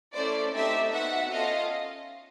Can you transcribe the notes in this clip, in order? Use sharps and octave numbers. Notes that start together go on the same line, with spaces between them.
A3 C#4 E4 C5 D5
A3 C4 D#4 G4 D5 E5
B3 D#4 F#4 E5 F#5
C#4 F4 A4 D#5 F5